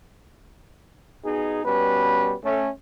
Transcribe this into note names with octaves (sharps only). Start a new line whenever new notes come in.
B2 D#4 G#4
B2 G3 C#4 B4
A3 C#4